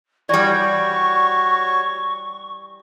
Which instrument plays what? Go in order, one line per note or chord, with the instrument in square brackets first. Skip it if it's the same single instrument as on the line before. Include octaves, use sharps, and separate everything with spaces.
[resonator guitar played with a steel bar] E3 G3 [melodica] F#4 C#5 [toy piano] D5 [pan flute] C#6